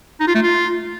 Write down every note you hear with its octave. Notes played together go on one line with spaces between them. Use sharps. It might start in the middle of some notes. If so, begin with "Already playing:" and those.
D#4
F4
A3
F4